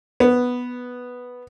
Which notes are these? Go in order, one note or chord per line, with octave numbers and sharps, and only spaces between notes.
B3